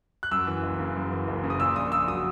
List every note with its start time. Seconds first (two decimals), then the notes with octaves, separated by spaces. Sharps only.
0.23 F#6
0.31 F#2 E6
0.47 E3
0.63 F#1
0.79 C#3
0.96 F#2
1.12 E3
1.27 F#1
1.43 C#3
1.50 D#6
1.60 A#2 E6
1.76 A#1 D#6
1.92 A#1 E6
2.08 F#3 D#6